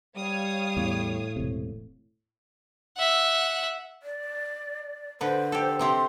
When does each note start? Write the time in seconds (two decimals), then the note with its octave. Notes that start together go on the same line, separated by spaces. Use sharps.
0.17 G3 C#5 F5 D#6
0.77 E2 A2
1.36 E1 C3
2.97 E5 F#5
4.03 D5
5.21 D3 B4 C5
5.52 G4 A4
5.79 C3 C4 G4 C6